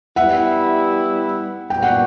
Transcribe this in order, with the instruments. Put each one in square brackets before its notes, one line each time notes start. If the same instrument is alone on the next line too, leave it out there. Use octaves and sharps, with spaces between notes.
[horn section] G3 B3 E4 [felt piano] E5 F#5
[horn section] A#2 G3 B3 D4 F#4 [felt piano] G5
[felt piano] F#5